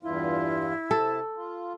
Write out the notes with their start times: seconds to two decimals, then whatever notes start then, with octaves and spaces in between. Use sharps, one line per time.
0.03 E2 G2 E4 F4
0.91 C3 A4 A5
1.36 F4